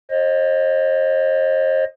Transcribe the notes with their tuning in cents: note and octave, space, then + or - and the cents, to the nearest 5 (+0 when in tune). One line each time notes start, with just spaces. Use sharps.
C5 +35 D#5 +0